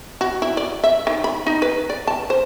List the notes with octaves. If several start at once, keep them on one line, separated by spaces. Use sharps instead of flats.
F#4
E4
D5
E5
D#3
B5
D#4
B4
D5
A5
C5